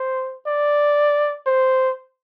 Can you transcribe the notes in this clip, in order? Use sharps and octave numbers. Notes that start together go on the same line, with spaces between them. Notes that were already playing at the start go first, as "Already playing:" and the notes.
Already playing: C5
D5
C5